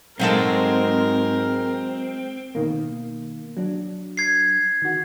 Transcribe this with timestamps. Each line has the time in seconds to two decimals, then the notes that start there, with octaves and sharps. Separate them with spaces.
0.20 G#2 F#3 G#3 C4 A4 A#4
2.55 B2 D#3 A#3
3.57 F#3 D4
4.17 G#6 C7
4.82 D#3 F#4